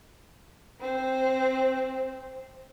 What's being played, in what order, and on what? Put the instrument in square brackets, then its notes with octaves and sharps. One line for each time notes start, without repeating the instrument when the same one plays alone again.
[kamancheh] C4 C5